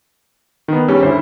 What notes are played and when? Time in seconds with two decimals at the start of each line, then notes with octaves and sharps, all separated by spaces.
0.68 D#3 B3
0.88 G3 C#4
1.03 D2 E4 C5